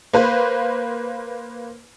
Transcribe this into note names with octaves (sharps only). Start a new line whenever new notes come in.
A#3 B4 C5